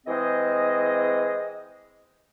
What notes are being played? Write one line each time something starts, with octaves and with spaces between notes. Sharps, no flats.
E3 G#3 C4 G#4 C5 D#5